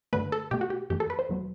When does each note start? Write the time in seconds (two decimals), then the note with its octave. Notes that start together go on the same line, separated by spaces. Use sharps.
0.13 G2 D3 A3 B4
0.32 A4
0.51 B2 A3 G4
0.61 F#4
0.70 G4
0.90 F#2 E3 A3 G4
1.00 A4
1.10 B4
1.19 C5
1.29 E2 B2 F#3 A3